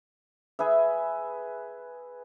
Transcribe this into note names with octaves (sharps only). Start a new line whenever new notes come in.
G#4 B4 E5